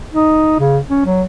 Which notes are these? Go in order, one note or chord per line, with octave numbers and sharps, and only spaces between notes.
D#4
C#3
C#4
F#3